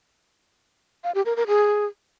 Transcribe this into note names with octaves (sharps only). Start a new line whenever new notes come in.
F5
G4
A#4
A#4
G#4